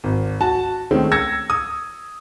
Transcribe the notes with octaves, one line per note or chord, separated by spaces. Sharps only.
G#1
F#4 A5
D#3 G#3 A3 C4 C#4
E6 G#6 A#6 C#7
D#6